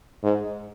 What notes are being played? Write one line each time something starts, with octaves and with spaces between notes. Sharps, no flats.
G#2